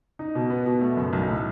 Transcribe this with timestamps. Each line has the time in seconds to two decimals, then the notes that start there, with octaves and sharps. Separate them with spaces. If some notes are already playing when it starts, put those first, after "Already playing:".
0.19 D#4
0.35 B2
0.50 B3
0.66 B2
0.81 A3
0.97 F#2
1.13 B1
1.28 A2